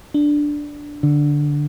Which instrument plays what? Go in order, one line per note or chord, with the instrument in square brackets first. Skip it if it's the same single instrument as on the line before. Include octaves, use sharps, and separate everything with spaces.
[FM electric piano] D4
[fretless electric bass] D3